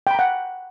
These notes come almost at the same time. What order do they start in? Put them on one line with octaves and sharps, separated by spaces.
G5 B5 A#5 F#5